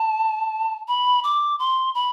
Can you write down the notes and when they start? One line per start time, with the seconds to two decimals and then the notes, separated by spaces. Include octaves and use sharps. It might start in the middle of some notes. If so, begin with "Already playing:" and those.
Already playing: A5
0.88 B5
1.24 D6
1.59 C6
1.95 B5